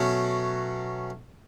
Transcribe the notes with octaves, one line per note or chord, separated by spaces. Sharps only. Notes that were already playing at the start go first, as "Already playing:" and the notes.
Already playing: B2 F#3 A3 C#4